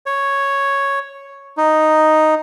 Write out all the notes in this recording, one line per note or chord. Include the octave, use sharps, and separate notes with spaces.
C#5
D#4